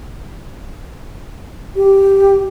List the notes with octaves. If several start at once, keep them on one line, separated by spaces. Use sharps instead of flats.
G4